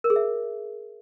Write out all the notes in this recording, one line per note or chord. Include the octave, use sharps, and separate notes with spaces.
A#4
G#4
E5